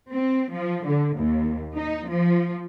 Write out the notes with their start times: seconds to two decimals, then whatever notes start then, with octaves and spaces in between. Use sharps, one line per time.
0.12 C4
0.52 F3
0.87 D3
1.19 D#2
1.75 D#4
2.06 F3